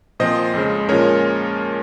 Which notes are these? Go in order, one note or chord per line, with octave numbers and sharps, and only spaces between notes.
A#2 F3 C4 C5 D#5
F2 C#3 G#3
A#2 F3 G#3 C#4 A#4 C#5